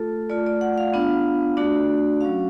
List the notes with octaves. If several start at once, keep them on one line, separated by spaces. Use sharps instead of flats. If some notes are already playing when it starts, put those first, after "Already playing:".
Already playing: A3 F4 A4
A3 F4 D5
D5
F#5
F5
B3 D4 F4
A3 D4 F#4 D5
F#3 C#4 F#4 F5